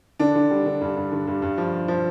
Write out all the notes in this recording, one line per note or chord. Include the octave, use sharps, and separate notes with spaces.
D3 D4
D3
G3
D3
G2
G2
D3
G2
G2
F3
F3
F3